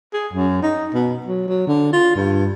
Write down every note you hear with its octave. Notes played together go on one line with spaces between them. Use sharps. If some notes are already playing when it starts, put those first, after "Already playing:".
G#4
F#2
D#4
B2
F#3
F#3
D3
F4
G2